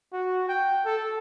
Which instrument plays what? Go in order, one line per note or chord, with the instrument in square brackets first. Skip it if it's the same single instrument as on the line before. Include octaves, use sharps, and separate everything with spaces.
[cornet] F#4
G5
A4